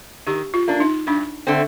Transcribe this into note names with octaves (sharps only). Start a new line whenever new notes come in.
D#3 G4
F4
A#3 D4
D#4
G2 D4
D3 A3 C4